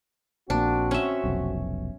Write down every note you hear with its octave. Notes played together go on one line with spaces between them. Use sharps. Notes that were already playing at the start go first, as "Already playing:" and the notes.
A#1 A#3 C4 D4 F#4
C#4 E5
F1 B1